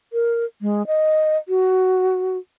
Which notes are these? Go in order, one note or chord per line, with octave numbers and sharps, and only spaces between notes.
A#4
G#3
D#5
F#4